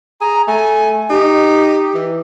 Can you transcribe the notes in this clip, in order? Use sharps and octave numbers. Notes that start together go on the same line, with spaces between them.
G#4 A#5
A3 G#5
D#4 G4
E3